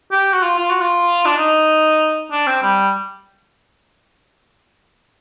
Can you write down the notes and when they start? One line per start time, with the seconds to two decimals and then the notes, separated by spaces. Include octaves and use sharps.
0.11 G4
0.34 F#4
0.43 F4
0.58 F4
0.70 F#4
0.81 F4
1.25 D4
1.37 D#4
2.32 D4
2.47 C4
2.62 G3